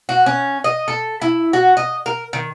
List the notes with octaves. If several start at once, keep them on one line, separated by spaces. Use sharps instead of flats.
F#4
C#4
D#5
A4
E4
F#4
D#5
A#4
D#3